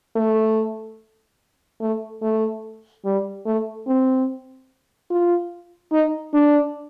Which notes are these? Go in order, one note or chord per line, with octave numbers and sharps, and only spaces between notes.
A3
A3
A3
G3
A3
C4
F4
D#4
D4